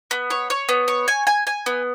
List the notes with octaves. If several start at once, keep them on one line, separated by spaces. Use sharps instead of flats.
B3
C#5
C#5
B3
C#5
G#5
G#5
G#5
B3